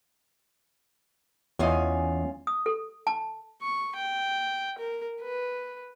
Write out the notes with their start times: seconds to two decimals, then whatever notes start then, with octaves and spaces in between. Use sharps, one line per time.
1.59 E2 C#4 F4 D#5 G#5
2.47 D#6
2.66 A4
3.07 A5
3.62 C#6
3.96 G5
4.78 A#4
5.22 B4